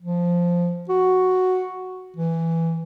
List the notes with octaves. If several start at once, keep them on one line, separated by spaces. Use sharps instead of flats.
F3
F#4
E3